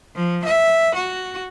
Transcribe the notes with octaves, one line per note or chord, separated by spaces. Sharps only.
F3
E5
F#4